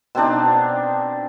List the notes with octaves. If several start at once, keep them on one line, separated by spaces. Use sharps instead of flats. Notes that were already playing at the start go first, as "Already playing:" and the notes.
B2 C4 D4 D#4